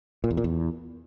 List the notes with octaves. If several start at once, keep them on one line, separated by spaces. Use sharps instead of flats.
A#2
E2
A#2
E2